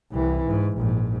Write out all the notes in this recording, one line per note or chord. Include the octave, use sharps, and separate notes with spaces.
C2 E3
G#2
A#1 G#2